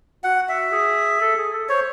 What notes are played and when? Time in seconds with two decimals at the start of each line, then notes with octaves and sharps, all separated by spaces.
0.24 F#4 F#5
0.49 E5
0.72 G#4
1.21 A4
1.38 G#4
1.53 A4
1.69 C5 C#5